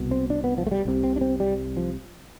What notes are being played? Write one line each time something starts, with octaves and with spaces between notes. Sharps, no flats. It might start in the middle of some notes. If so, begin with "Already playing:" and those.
Already playing: C2 B2
C4
D4
B3
F3
A3
G3
C2 C3
C4
D4
C4
G3
F3